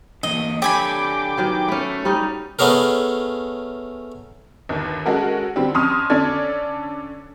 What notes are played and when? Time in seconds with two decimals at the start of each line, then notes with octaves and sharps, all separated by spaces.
0.23 D3 E3 A#3 D#5
0.62 D4 G4 A4 C#5 G5 G#5 B5 D6
1.37 D#3 F#3 B3
1.68 A3 C#4 B4
2.05 G3 C#4 D#4
2.59 A3 B3 C#4 G#4 A#4
4.69 G1 D#2
5.06 G#3 C#4 F#4 A4 A#4
5.56 D3 G3 C4
5.75 F2 C#4 C6 C#6 D#6 F6
6.10 D3 C#4 D4 A4 D5 G#6